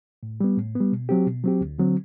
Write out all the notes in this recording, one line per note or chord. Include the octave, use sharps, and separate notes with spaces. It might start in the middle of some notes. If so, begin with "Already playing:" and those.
A2
G3 B3
A2
G3 B3
B2
F#3 C4 G4
B2
F#3 C4 G4
D2
D3 F#3 C4